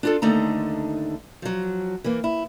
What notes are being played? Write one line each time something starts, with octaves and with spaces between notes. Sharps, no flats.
D4 F4 A4
D#2 D3 A3 D#4 A#5
F3 F#3
E3 A#3
E4